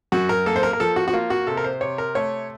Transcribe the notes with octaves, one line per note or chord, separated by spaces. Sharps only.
F#2 F#4
A#4
A#3 A4
C5
A#4
A#4
F3 A4
F#4
F#4
A#3 F4
F#4
C3 A4
A#4
C5
C3 C#5
A#4
A3 C#5